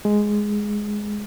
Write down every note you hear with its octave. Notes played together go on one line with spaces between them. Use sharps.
G#3